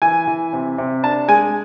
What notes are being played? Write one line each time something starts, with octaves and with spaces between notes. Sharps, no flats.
E3 G#5
E3
C3
C3
D4 A5
G#3 G#5